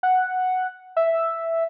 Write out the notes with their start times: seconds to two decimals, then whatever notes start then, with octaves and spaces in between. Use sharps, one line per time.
0.03 F#5
0.96 E5